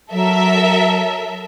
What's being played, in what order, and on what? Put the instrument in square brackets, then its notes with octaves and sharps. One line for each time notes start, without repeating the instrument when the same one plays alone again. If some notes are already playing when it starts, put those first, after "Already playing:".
[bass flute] F#3 [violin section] A4 A#4 E5